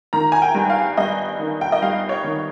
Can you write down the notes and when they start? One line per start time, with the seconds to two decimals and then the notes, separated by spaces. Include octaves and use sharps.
0.13 D#3 A#5
0.32 G#5
0.42 G5
0.55 G2
0.70 F5
0.97 G2 D#5
1.39 D#3
1.61 G5
1.72 D#5
1.82 G2 F5
2.09 C#5
2.24 D#3